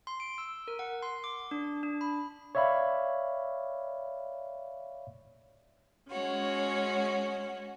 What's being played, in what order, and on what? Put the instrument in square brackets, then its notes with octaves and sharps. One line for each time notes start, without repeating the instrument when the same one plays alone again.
[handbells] C6
D7
E6
A#4
F#5
C6
D6
D4
D4
B5
[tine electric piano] C#5 D5 E5 F5 B5
[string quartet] G#3 C#4 F#4 C#5